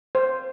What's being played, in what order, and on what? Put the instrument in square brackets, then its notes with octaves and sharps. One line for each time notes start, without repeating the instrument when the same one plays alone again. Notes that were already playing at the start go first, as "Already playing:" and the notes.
[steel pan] C5